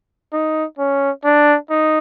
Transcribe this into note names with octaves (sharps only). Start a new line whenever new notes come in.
D#4
C#4
D4
D#4